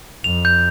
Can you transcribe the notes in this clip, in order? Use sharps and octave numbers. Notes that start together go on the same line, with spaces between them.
F2 F7
G6